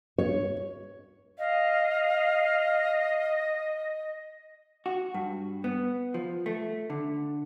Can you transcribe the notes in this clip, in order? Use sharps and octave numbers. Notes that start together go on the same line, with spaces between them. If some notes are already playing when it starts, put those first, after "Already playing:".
C#5
D#5 F5
F#4
G2
B3
F3
A3
D3